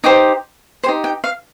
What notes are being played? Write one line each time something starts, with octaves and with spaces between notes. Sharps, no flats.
D#4 G4 C5 D6
D#4 G4 C5 C6
G5
F5